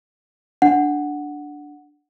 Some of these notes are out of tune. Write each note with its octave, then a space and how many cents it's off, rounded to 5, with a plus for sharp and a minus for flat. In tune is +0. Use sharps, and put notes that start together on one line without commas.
D4 +0 F#5 +0